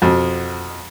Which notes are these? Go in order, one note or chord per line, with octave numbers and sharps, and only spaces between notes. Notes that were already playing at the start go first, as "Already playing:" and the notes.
F2 B2